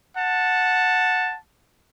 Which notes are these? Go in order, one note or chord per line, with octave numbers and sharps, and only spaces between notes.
F#5 A5